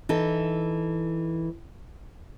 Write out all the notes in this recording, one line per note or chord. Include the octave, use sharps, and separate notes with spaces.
E3 D#4 A4